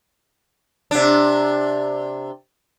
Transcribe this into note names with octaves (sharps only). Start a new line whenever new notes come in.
C3 D4